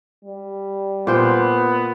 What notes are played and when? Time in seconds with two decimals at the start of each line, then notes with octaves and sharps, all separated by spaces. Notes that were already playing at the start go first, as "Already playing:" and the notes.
0.25 G3
1.07 A#2 B3 C5 G5